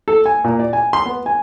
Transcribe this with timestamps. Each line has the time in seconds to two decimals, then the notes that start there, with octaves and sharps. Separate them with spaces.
0.08 A4
0.26 G#5
0.44 A#2
0.59 D5
0.73 G#5
0.93 C6
1.05 B3
1.26 G#5